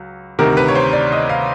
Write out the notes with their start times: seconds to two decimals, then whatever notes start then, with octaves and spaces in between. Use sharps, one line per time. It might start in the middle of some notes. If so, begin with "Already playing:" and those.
Already playing: C#2 F#3
0.39 D2 C3 D#3 A#4
0.57 B4
0.68 C#5
0.75 C5
0.93 D5
1.12 D#5
1.29 F5